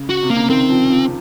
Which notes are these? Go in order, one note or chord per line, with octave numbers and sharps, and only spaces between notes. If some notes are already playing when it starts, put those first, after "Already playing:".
Already playing: C#3
F#4
C3
A#3
C#3
D#3 C4
F3
F3